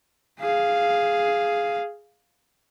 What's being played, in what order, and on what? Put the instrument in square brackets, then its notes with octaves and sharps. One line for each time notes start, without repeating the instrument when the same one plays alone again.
[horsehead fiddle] G#4 F5